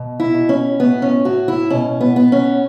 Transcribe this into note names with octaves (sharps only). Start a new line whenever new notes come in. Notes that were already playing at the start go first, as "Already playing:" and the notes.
Already playing: B2
E4
B2
C#4
A2 B3
C#4
A2 F#4
E4
B2 C#4
B3
B3
C#4